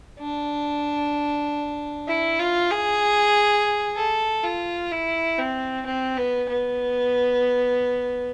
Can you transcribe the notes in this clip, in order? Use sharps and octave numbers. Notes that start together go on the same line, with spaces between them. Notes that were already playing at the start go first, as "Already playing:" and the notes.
D4
E4
F4
G#4
A4
F4
E4
C4
C4
B3
B3